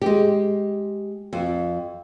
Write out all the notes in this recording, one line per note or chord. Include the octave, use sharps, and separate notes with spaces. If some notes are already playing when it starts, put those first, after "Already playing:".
G#3 G4
F2